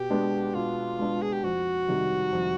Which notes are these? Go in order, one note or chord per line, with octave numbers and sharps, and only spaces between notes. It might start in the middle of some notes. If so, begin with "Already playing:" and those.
Already playing: B2 G4
G#3 B3 D4
B2 F4
G#3 B3 D4
G#4
G4
F2 F#4
C3 D#3 G3
F2